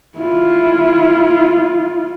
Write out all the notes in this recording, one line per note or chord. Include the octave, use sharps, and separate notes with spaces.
E4 F4